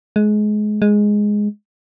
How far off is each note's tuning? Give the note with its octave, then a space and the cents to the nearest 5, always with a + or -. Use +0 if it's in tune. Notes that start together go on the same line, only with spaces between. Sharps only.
G#3 +25
G#3 +0